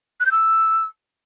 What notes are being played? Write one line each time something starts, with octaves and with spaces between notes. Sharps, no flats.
F#6
G6
E6